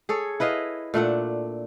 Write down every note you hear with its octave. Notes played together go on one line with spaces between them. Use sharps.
G#4 A4 C#5
E4 B4 D#5 F5
A#2 A3 D4 F#5